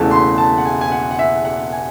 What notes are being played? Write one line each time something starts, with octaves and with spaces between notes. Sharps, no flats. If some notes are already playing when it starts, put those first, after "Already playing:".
Already playing: E1 E2 C#3 E3 A3 A5
C6
A5
F#5
G#5
G#5
F#5
F#5
E5
F#5
G#5